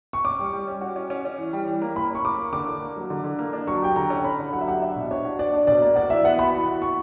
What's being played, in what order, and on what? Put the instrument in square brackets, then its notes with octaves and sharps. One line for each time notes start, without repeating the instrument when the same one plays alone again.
[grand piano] C#6
[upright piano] C#4 [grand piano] D6
[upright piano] G3
G3
C#4
F#4
C#4
C#4
C#4
E3
G3
E3
A#3
[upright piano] A#3 [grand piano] B5
[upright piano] C#4 [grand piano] C#6
[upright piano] A#3 [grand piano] D6
[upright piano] A#3
[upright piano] D3 [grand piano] D6
[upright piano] D3
A#3
F#3
D3
D3
A#3
D4
[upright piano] F#3 [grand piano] C#6
[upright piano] G4 [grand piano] G5
[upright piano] D3 [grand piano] A#5
[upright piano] C#4
[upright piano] C#4 [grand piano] B5
[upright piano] D3
[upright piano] F#3 [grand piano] F#5
[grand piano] E5
[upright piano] G4 [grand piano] F#5
[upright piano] D4 [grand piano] E5
[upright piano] B2
[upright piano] D4 [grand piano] C#5
[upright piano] F#4
[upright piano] D4 [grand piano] D5
[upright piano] D4
[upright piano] B2 [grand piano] D5
[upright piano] A#3
[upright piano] F#4 [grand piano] D5
[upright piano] E3 [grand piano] E5
[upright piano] B3 [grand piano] F#5
[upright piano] F#4 [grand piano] B5
[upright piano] E3
F#4
[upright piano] E3 [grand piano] C#6